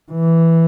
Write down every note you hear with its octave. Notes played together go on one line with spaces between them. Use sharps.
E3